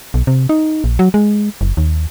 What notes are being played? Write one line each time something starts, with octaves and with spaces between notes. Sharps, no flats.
B1
C3
D#4
A#1
F#3
G#3
F#1
D#2